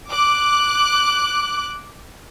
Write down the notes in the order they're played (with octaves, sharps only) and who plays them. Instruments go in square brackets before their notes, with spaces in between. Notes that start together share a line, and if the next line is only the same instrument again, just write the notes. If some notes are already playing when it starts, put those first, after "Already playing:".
[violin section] D6 F#6